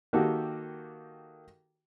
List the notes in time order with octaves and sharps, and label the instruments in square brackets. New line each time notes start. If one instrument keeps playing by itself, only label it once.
[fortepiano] D#3 A#3 F#4 G4 A4